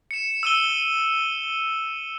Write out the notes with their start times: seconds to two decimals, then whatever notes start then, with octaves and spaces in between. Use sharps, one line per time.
0.11 C#7 E7
0.43 E6 D#7 G7